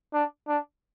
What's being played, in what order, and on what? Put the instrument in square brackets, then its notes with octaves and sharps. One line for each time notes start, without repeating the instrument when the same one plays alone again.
[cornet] D4
D4